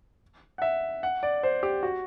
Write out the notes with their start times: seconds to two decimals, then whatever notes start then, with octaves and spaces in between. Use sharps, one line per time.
0.58 F#5
0.62 E5
1.03 F#5
1.23 D5
1.43 C5
1.63 G4
1.83 F#4